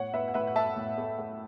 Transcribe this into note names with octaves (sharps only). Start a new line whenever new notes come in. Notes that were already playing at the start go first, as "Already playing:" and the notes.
Already playing: A2 C#5 F#5
A2 B4 E5
F#5
A2 B4 E5
F#5
A3 E5 A5
A2
A3
A3